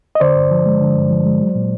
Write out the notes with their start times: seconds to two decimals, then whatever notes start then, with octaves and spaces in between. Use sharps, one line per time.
0.15 D#5
0.20 D3 C5 D5
0.35 G2
0.51 F3
0.66 G#3
0.81 D3
0.96 G2
1.10 F3
1.25 G#3
1.41 F#3
1.55 A#2